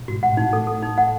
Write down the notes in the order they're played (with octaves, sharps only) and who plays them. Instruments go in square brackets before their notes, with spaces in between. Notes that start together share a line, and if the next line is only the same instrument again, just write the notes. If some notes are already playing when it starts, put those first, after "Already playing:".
Already playing: [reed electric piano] B2
[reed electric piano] G#2 [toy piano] F#4
[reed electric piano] A2 [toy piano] F#5
[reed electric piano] A2 [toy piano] D#4
[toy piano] A4
A4
D#4
F#5